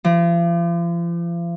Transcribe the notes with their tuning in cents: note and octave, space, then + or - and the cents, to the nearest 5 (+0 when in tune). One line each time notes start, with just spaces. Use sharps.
F3 -40